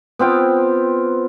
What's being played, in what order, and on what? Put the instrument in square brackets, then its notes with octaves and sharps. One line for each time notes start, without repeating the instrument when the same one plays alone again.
[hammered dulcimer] B3 C4 F4 G5